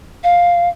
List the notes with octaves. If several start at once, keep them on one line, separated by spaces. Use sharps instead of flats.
F5